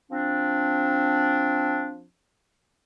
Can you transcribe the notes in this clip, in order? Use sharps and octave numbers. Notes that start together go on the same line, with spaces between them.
F3 C4 D4